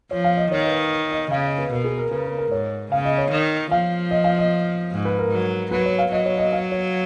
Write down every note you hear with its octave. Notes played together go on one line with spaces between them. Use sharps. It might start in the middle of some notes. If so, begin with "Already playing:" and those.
F3 C#5
F5
D#5
D#3 C#5
B4
D#5
C#3 F5
D#5
B4
B2 A#4
G#4
A#4
C#3 B4
A#4
A#4
G#2 C#5
C#3 F5
D#5
C#5
D#3
F3 F5
D#5
F5
D#5
G#2
B4
A#4
F#3
F#3 B4
C#5
F5
F#3 D#5
C#5
D#5
F5
C#5